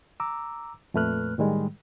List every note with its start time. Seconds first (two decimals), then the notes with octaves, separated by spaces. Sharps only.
0.20 A#5 D6 E6
0.94 F2 A#2 A3 B4 F6 F#6
1.38 A2 D#3 G3 G#3